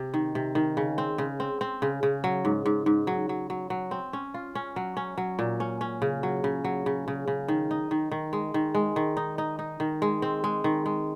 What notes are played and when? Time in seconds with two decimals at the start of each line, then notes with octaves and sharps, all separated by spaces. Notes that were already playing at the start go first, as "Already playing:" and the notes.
Already playing: C3
0.14 D#3
0.35 C3
0.55 D#3
0.77 C#3
0.98 C4
1.18 C#3
1.40 C4
1.61 C4
1.82 C#3
2.03 C#3
2.24 F#3
2.45 G#2
2.66 G#2
2.86 G#2
3.07 F#3
3.29 F#3
3.50 F#3
3.70 F#3
3.91 C4
4.13 C#4
4.34 F4
4.55 C#4
4.76 F#3
4.97 C#4
5.17 F#3
5.39 A#2
5.60 C#4
5.81 C#4
6.02 C#3
6.23 F#3
6.44 C#3
6.64 F#3
6.86 C#3
7.08 C#3
7.28 C#3
7.48 D#3
7.71 D#4
7.91 D#3
8.11 D#3
8.33 G#3
8.54 D#3
8.75 G#3
8.96 D#3
9.17 D#4
9.38 D#4
9.59 D#4
9.80 D#3
10.02 G#3
10.22 C4
10.44 G#3
10.64 D#3
10.86 G#3